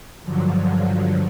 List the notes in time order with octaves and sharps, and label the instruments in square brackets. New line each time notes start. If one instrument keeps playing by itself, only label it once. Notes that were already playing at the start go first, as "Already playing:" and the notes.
[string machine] G2 D3 F3 F#3